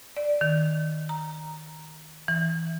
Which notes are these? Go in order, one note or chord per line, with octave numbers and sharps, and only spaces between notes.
D5
D#3
A#5
E3